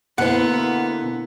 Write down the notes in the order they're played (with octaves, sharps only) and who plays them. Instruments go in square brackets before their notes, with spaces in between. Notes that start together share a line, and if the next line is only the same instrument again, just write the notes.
[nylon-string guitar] B2 D3 C5 [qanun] A#3 E4 [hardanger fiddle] B3 [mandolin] F#5